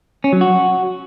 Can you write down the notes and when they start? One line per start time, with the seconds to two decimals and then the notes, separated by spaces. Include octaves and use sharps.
0.24 C#4
0.33 F#3
0.41 F#4